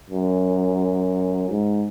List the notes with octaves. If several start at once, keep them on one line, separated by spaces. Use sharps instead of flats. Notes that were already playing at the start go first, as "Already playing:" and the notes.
F#2
G#2